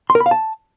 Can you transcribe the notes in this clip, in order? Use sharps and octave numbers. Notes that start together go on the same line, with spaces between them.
C6
A#4
B5
F5
A5